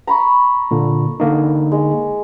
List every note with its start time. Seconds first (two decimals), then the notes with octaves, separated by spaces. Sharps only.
0.07 A#5 B5 C#6
0.71 A#2 D3
1.20 D3 A#3 D#4
1.72 G#3